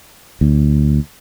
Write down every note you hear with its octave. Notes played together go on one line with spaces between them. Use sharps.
D2